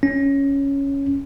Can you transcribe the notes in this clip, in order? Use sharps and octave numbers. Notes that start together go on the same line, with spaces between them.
C#4